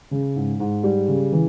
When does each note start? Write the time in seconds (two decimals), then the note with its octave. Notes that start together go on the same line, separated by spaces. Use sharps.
0.11 C#3
0.36 G#2
0.60 G#2
0.84 G3
1.08 C#3
1.32 E3